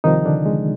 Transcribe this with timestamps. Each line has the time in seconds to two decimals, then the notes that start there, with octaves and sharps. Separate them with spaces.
0.04 C2 C3 D#3 F3 D#4
0.25 D3 D4
0.46 G#3